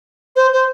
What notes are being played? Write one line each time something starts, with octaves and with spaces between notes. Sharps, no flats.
C5
C5